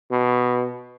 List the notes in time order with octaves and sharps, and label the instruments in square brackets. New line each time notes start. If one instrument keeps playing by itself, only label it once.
[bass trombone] B2